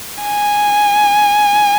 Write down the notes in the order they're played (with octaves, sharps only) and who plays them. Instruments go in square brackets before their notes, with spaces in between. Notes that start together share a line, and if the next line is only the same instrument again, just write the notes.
[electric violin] G#5